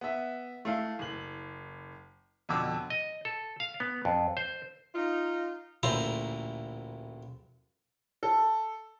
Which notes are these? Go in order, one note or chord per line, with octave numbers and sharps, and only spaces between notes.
B3 E5
A3 E4 F5
F#1 F#7
F2 B2 D3 D6 E6
D#5
A4
F5
B3
F2
C5
D#4 F4
A1 D2 A#2 E4 C5 A#5
A4